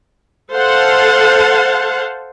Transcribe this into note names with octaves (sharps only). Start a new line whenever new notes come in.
A4 C5 F5 F#5 A5